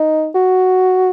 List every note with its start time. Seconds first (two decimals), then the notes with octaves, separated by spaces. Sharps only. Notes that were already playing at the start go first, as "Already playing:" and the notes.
Already playing: D#4
0.35 F#4